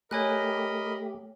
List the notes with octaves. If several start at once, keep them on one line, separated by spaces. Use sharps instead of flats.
A3 G4 A#4 C#5 D#5 G#5 B5 F#6